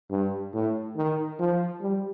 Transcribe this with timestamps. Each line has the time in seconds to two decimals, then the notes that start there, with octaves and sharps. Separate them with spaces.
0.11 G2
0.54 A2
0.97 D#3
1.40 F3
1.81 G3